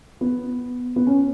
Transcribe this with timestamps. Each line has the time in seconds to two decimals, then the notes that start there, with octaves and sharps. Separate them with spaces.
0.21 B3
0.96 B3
1.07 C#4